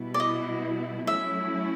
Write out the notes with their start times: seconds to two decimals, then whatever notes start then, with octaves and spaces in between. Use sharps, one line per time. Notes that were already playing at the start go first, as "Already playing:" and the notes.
Already playing: B2 G3 B3 E4
0.14 D5
0.20 D#5
1.07 F#3 A3 C#4 E4 E5